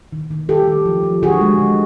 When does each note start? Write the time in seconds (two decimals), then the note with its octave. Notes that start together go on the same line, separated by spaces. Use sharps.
0.13 D#3
0.31 D#3
0.49 D#3 G4 A4
0.68 D#3
0.86 F3
1.03 F3
1.23 D3 F#4 G#4
1.41 G#3
1.59 D3